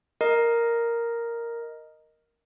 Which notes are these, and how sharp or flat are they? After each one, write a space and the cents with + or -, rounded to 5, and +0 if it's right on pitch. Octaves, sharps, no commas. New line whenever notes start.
A#4 +0 D#5 +0